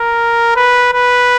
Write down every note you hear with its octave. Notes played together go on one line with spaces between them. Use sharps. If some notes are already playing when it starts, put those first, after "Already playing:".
Already playing: A#4
B4
B4